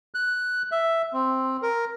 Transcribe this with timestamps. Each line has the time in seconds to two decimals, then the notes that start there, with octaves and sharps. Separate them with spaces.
0.15 F#6
0.72 E5
1.13 C4
1.62 A#4